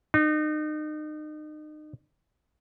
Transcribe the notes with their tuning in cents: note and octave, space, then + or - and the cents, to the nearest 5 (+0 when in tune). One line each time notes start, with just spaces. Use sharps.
D#4 -35